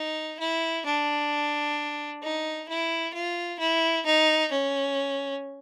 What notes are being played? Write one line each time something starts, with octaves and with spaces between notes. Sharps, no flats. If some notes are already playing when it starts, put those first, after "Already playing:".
Already playing: D#4
E4
D4
D#4
E4
F4
E4
D#4
C#4